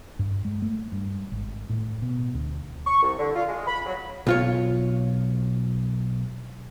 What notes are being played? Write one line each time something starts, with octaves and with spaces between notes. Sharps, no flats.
G2
G#3
A3
G2
G#1
A2
B2
D2
C#6
C2
D3
F4
G#3
B5
F#3
B1 F4 C#5